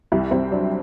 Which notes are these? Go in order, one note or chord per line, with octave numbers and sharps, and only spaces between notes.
C2 E4
C2 C4
F#3 D4